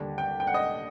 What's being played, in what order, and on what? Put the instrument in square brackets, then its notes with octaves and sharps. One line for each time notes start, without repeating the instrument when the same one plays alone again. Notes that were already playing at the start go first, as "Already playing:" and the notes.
Already playing: [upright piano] D#2 D3 G3
G5
G5
F#5
D#5